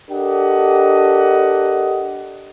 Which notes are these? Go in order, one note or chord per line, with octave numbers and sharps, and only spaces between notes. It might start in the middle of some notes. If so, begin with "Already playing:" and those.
D4 G4 A4 A#4 D#5 F#5